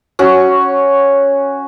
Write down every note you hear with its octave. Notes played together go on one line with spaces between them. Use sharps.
C#4 F#4